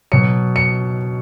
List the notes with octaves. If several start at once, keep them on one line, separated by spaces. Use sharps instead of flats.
B2 F#3 C#7
C#7